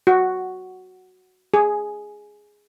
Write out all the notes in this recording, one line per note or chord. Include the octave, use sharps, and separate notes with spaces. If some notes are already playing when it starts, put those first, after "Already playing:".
F#4
G#4